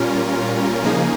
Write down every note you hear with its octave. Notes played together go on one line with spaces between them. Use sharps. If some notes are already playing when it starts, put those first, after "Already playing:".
Already playing: A#2 G3 C#4 F4 A#4
C#3 F3 A#3 D#4 G#4